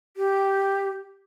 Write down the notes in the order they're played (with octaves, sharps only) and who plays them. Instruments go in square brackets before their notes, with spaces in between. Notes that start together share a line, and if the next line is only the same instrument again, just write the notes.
[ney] G4